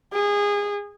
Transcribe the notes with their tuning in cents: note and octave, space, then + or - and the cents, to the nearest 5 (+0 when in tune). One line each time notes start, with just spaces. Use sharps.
G#4 -25